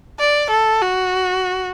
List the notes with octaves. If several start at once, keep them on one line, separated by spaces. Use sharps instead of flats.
D5
A4
F#4